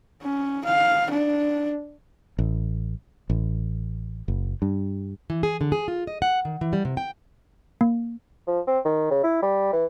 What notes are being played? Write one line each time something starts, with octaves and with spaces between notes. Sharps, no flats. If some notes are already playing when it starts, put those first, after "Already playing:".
C#4
F5
D4
A1
A1
F#1
G2
E3
G#4
D3
G#4
F4
D#5
F#5
D#3
E3
G3
C3
G5
A#3
F3
C4
D#3
C#3
E4
G3
E3